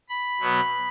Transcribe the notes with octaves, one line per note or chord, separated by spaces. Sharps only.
B5
B2 F#3 B3